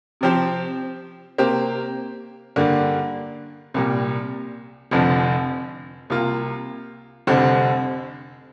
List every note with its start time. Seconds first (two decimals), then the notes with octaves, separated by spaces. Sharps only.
0.21 C3 F3 C4 G4 C5
1.38 C3 A#3 G4 C5
2.56 G2 D3 A#3 D4
3.74 C2 A#2 G3
4.91 F1 F2 D3 F3
6.10 C2 C3 A#3 F4
7.27 F1 F2 D3 G3 C4